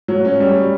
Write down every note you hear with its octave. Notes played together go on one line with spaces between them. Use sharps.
F#3
C#4
G3